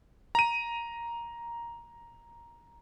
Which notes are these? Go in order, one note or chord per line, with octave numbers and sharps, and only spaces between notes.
A#5 D#7